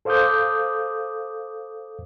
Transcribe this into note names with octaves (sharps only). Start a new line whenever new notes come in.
A4 C5 F5 D6 D#6 G6